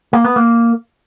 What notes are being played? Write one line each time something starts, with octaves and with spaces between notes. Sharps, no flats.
A#3
B3
A#3